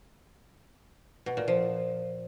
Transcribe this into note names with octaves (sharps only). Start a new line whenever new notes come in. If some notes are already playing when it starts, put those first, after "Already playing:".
B2
A#2
F3